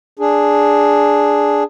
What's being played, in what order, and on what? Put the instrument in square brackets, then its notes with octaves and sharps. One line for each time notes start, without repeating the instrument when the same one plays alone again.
[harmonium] D4 G#4